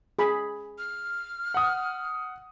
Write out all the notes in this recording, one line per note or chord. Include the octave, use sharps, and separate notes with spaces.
G#4 B5
F6
F#5 D#6